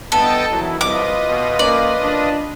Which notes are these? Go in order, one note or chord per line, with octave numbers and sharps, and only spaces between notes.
G2 E3 B3 A4 D#5 G5 A5
A#1 B2 E3 F#3 E4
C2 F4 B4 D#5 D6
B2
A#3 C#4 D5
D4